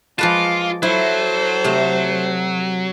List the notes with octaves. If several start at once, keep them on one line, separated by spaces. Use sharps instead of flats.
F3 G#3 F4 B4 A5 D6
F#3 E4 A4 C5
C3 A3